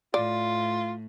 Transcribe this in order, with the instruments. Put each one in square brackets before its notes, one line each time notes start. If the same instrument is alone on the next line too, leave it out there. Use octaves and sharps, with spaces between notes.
[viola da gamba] A2 [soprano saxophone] F4 [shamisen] D5